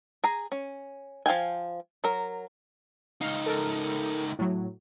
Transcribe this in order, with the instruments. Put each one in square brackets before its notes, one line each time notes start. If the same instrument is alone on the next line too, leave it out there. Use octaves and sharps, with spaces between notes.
[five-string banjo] G#4 A#5
C#4
F3 F5 G5 G#5
F#3 A#4
[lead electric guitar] C#2 D#4 [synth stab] F5
[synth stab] A4 A#4
A2 F#3